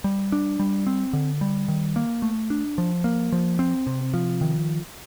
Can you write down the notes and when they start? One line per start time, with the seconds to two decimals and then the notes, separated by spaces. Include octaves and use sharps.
0.04 G3
0.32 D4
0.59 G3
0.87 C4
1.13 D3
1.41 G3
1.68 D#3
1.96 A#3
2.22 A3
2.50 D4
2.78 F3
3.04 A#3
3.32 F3
3.59 C4
3.87 C3
4.14 F3
4.41 D#3